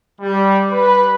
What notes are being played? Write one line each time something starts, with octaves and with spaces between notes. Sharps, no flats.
G3
B4